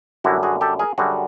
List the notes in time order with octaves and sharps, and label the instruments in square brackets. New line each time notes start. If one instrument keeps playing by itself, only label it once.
[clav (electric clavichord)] F#2 D3 G3 E4 F#4
F#4 G#4
G4 A4
G#4 A#4
F#2 D3 G3 F#4 G#4